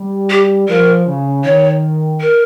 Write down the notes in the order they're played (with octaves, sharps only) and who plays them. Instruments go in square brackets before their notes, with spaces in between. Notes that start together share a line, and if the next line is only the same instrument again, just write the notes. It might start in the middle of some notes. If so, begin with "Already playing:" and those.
Already playing: [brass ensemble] G3
[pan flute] G4
[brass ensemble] F3 [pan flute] A#4
[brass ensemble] C#3
[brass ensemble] D#3 [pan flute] C#5
[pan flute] A#4